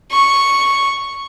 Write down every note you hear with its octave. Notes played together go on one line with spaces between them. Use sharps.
C#6